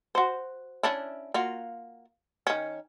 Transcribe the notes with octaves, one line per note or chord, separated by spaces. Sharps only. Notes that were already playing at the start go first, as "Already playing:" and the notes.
F#4 C5
C#4 D4 E4
A#3 F4 F#4
D#3 C#4